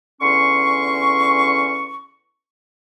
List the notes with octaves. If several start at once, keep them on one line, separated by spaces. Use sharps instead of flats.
E2 D3 C#4 C6 C#6